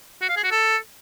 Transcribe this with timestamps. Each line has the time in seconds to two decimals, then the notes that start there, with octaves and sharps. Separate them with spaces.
0.22 F#4
0.29 F5
0.36 G#4
0.44 F#4
0.51 A4